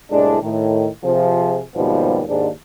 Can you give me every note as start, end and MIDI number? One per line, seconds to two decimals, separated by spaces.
0.11 0.40 36
0.11 0.40 45
0.11 0.40 56
0.11 0.40 62
0.42 0.87 45
0.42 0.87 51
1.04 1.62 48
1.04 1.62 53
1.04 1.62 68
1.76 2.22 39
1.76 2.22 44
1.76 2.22 47
1.76 2.22 53
1.76 2.22 55
1.76 2.22 59
2.29 2.49 39
2.29 2.49 44
2.29 2.49 62